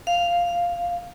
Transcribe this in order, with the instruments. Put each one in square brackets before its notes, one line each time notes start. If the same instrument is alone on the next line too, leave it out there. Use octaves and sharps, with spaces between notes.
[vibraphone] F5